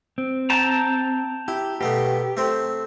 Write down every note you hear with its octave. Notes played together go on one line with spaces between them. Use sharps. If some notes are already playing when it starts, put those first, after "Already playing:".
C4
G5 A5 A#5
E4 G4
B2 A3 B3 G4
A3 C4 C5